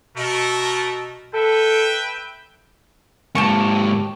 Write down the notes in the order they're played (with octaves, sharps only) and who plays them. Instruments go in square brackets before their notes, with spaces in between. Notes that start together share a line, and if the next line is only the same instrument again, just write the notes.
[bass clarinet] B2 [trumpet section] A3 A4 A#4
[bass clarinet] A4 [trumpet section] B4 E5 G5
[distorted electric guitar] G#2 A#3 [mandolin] G4 A5 C#6